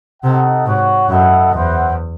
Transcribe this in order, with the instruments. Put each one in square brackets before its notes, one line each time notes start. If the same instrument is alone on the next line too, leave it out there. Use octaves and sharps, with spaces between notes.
[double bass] C3 [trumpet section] D#4 A4 D#5 F#5
[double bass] G#2 [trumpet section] F#4 C#5 F#5
[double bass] F#2 [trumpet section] E4 A4 D#5 F#5
[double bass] E2 [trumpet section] E4 C5 F#5